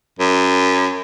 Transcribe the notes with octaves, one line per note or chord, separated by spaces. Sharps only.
F#2